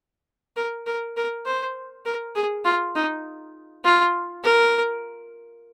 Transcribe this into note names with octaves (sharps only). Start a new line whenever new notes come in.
A#4
A#4
A#4
C5
A#4
G#4
F4
D#4
F4
A#4